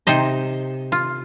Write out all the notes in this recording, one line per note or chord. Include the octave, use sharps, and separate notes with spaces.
C3 D#4 C5 D#5
F4